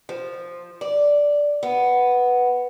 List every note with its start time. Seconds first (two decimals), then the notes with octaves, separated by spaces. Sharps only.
0.09 F3
0.81 D5
1.63 B3